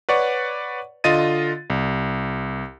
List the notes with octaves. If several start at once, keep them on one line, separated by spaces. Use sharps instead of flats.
B4 C#5 D5 F#5 C#6
D3 F4 D#5 A6 D#7
C2